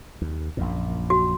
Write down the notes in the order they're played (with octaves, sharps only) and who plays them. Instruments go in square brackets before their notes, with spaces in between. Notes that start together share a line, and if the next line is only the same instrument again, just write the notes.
[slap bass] D#2
A#1 F#2 A#2
[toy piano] F#4